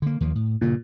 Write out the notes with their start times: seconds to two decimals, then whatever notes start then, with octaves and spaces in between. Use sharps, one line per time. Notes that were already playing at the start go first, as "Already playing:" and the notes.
0.02 D3 A#3
0.21 D#2 F3 A#3
0.35 A2
0.61 G2 A#2 C#3